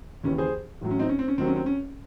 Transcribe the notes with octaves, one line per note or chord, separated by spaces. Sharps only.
D#2 C#3 E3 C#4
G#4 C5
A1 A2 F#3
C#4
C4 D#4
C#4
C4
C#4
D#2 D#3 F#3 C4
C#4
C4
C#4